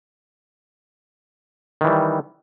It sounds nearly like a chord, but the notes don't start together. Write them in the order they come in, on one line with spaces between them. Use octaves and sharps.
D#3 E3 G3